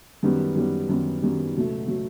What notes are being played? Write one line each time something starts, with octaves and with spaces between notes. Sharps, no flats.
F#2 D#3 G3 B3
F#2 D#3 G3 B3
F#2 D#3 G3 B3
F#2 D#3 G3 B3
C#2 B2 F#3 A3
B2 F#3 A3